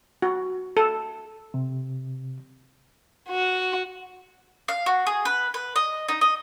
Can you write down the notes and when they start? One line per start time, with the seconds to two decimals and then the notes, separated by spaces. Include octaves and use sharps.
0.22 F#4
0.77 A4
1.54 C3
3.29 F#4
4.68 F5
4.86 F#4
5.07 G#4
5.25 B4
5.54 B4
5.76 D#5
6.08 D#4
6.21 D#5